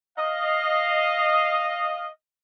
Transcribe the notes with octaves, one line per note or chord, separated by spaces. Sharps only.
D#5 F5